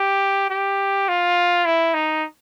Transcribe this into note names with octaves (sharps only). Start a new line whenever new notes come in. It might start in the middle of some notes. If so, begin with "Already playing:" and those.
Already playing: G4
G4
F4
E4
D#4